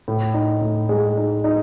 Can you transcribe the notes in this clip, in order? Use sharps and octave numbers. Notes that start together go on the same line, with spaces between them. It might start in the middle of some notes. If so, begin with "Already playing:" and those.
A2
D#4
A2
G#3
D#4
D#4